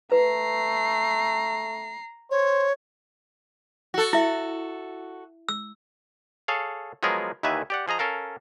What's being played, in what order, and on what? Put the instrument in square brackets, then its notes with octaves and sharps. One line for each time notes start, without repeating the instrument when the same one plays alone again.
[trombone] A3 [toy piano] B4 [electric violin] A#5 C7
[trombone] C5 [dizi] C#5
[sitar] F#4 A4
[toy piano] E4 E5
E6
[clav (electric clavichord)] G#4 A4 C#5 F5
F3 F#3 G#3 B3 G#4 A#4
D#2 D#3 E3 B4 E5 G#5
G4 D5 F#5
F3 G#4 D#5 A#5
C#4 A4 A#4 F5